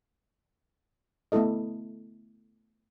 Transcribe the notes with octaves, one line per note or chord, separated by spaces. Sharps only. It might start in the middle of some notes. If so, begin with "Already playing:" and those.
A3 B3 E4 A4 D#5